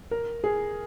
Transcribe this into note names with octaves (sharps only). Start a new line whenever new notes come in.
A#4
G#4